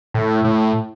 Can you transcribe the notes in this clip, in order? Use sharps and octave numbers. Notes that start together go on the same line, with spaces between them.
A2
A2